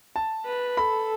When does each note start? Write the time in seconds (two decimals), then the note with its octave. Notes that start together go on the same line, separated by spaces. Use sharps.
0.16 A5
0.46 B4
0.77 A4 B5